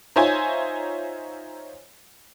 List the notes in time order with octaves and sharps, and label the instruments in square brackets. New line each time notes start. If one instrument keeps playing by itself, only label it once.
[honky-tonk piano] D#4 F4 C5 C#5 E5 G#5